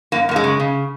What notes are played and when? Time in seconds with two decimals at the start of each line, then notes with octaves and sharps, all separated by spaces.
0.12 F#2 A#3
0.29 F#2 A#3
0.36 G#3
0.44 C#3
0.60 C#3